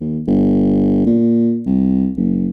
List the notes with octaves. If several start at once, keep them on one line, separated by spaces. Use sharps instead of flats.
D#2
G1
A#2
C2
F#1